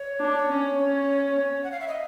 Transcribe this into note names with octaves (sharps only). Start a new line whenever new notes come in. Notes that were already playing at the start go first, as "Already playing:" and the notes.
Already playing: C#5
D4
C#4
C#4
F#5
F5
E5
D#5